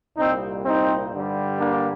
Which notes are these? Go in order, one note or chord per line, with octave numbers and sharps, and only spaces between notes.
C2 A#2 G3 C4 D#4
C4 D#4
G2 D3 G3
A#3 D4